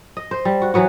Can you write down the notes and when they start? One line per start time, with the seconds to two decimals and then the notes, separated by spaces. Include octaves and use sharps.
0.17 D#5
0.31 C5
0.45 G3
0.62 F#4
0.74 E3 F#3 B3 F#4